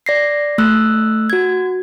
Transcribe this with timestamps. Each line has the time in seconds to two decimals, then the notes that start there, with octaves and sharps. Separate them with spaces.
0.06 D5 A#6 C7
0.58 A3 E6 F#6
1.30 F#4 G#6